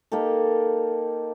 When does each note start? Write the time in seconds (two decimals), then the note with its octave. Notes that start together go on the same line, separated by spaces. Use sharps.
0.12 A#3 D#4 G4 A4